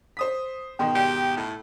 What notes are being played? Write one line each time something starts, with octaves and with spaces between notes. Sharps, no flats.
C5 D#6 B6
G#2 B2 D#3 G5 C6
G4
A2